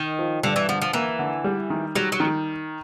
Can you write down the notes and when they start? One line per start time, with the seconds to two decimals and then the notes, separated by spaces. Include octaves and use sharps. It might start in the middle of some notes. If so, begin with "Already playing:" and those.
Already playing: D#3
0.19 F3
0.43 G2 D3
0.56 E3
0.69 D3 F3
0.82 F3
0.93 E3 A#3
1.19 D3
1.44 G3
1.70 D#3
1.95 F#3 G3
2.12 F#3
2.20 D#3